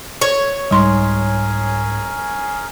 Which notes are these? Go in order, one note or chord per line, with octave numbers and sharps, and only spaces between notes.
C#5
C2 G#2 G3 C#4 G#4 A#4 C6 C#6